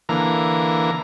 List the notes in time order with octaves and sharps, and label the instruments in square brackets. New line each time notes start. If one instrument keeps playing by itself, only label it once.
[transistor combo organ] D3 E3 A#3 A#5